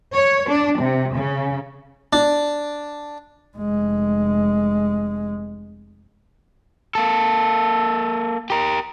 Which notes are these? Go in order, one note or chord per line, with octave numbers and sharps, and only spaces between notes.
C#5
D4
C3
C#3
D4
F1 G#3
A#3 A4
G4 A#4